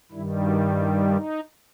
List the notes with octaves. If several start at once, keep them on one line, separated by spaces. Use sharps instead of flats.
G2 D#3 G3 E4
F#4
E4
D#4